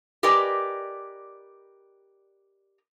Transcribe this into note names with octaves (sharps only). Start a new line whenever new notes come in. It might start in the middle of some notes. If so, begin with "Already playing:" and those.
G4 A#4 B4 D5 D#5 G#5